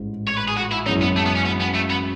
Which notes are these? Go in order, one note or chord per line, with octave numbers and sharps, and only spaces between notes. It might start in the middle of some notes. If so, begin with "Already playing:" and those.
Already playing: A1 G#2 E3
C#5
B4
G#4
F#4
E4
F#2 E3 G#3 C#4 D#4
B3
A3
B3
C#4
B3
B3
A3
B3